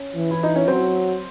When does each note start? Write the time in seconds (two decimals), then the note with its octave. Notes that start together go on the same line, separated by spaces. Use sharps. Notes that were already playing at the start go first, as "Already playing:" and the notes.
Already playing: C#4
0.16 E3
0.31 E4
0.43 D#4
0.56 C#4
0.68 F#3 C4